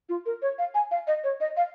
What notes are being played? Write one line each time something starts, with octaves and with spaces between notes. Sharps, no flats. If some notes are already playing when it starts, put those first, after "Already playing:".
F4
A#4
C#5
F5
G#5
F5
D#5
C#5
D#5
F5